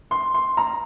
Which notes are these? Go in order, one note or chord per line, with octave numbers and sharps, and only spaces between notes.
C6
C6
A#5